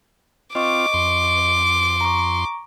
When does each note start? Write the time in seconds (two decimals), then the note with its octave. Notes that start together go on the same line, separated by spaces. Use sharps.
0.55 C4 F4 D#5 C#6 D6
0.94 F2 C6
2.01 A#5 C#6